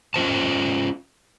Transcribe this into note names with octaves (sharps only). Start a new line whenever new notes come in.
C#4 F4 C5 A5